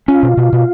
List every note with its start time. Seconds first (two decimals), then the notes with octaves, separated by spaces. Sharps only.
0.08 C#4 F4
0.23 B2
0.37 B2
0.53 B2